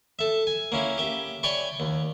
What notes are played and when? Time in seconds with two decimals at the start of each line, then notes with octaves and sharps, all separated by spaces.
0.19 A4 E5
0.47 G#5
0.72 A#3 C#4 E4
0.98 G4 E5
1.43 C#5 D5 G5 G#5 B5 C#6
1.80 D#2